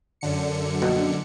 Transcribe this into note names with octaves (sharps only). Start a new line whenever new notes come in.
F#2 D3 C#7
A#1 B2